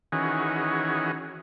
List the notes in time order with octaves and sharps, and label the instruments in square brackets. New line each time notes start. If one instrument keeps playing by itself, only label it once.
[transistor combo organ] D#3 E3 C#4 F#4 G#4